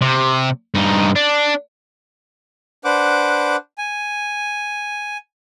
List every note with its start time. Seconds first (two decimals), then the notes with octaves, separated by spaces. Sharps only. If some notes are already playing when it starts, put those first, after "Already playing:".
0.01 C3
0.75 G2 D#4
1.16 D4
2.85 D4 B4 C5 F#5 D6
3.78 G#5